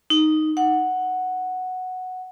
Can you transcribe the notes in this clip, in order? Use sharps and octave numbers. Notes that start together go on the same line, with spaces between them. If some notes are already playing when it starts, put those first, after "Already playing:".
D#4
F#5